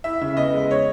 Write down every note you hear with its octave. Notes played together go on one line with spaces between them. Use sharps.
E4 E5
C#3 E5
B3 D#5
G#3
C#5